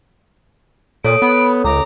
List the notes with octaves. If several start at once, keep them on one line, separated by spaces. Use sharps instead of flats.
A#2 A4 C#5 D#6 D7
B3 B5
C#2 A#5 D6